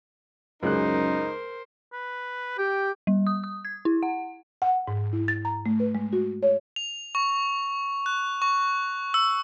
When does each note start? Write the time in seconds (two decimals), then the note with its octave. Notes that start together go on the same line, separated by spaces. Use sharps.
0.63 C#2 F#2 G#3 D#4 A#4 C5 F#6
1.93 B4
2.59 G4 G5
3.07 G3
3.27 D#6
3.44 D#6
3.65 G#6
3.85 E4
4.03 F#5
4.62 F#5
4.88 G#2
5.13 E4
5.28 A6
5.45 A#5
5.66 A3
5.80 B4
5.95 G#3
6.13 F#4
6.43 C#5
6.76 F7
7.15 C#6
8.06 F#6
8.42 C#6
9.14 E6